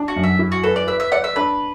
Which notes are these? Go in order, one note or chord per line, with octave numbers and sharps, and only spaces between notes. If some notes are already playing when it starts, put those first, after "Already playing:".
Already playing: D4
F#4
F#2
E5
E4
F#4
A4 B4
D5
B4 E5
E5
D5 F#5
E5
D4 B4